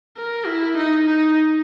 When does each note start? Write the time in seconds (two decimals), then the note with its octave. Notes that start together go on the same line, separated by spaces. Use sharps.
0.17 A#4
0.47 E4
0.78 D#4
1.06 D#4